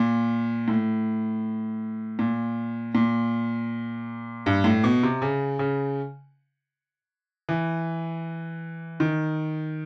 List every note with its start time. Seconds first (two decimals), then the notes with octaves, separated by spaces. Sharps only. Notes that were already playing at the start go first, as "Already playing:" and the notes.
Already playing: A#2
0.68 A2
2.19 A#2
2.95 A#2
4.46 G2
4.64 A2
4.84 B2
5.03 C3
5.22 C#3
5.59 C#3
7.49 E3
9.00 D#3